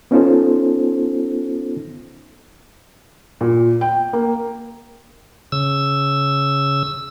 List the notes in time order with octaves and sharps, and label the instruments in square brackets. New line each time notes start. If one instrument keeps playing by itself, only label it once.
[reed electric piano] B3 C#4 D#4 F4 A4 C5
[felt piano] A#2
G5
A#3
[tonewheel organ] C#3 E6